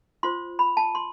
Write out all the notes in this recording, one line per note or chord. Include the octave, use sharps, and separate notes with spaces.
F4 C5 C6
B5
A5
C6